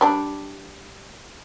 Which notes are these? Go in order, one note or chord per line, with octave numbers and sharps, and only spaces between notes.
G3 D4